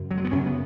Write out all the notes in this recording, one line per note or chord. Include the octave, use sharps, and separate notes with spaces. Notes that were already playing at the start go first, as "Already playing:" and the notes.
Already playing: F#2 C#3
F#3
G#3
B3
F#2 C#3 C#4
B3